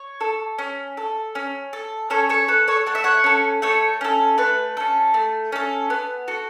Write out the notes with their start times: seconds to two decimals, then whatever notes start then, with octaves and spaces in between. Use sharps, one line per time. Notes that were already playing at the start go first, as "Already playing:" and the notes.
Already playing: C#5
0.21 A4
0.58 C#4
0.97 A4
1.35 C#4
1.73 A4
2.10 C#4 A4 C#5
2.29 A4 C#5
2.48 A4 B4
2.68 A4 C#5
2.86 A3 F#5
2.95 E5
3.04 C#5 F#5
3.24 C#4 A4
3.62 A3 A4 C#5
4.01 C#4 A4
4.38 A3 B4
4.77 C#4 A4
5.14 A3
5.52 C#4 A4
5.90 B3
6.28 F#4 A4